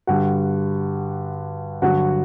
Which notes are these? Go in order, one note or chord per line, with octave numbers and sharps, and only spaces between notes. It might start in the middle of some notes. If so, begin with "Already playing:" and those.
G2 D3 G3 F#4 F#5
G2 D3 F#3 F#4 F#5